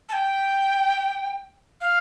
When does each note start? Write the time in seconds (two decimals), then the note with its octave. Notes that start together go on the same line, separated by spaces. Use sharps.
0.09 A5
0.13 G5
1.81 F5